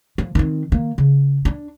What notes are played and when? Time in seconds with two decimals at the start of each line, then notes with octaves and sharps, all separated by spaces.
0.18 F3
0.35 D#3 C4
0.72 D#3 A#3
0.98 C#3
1.45 D4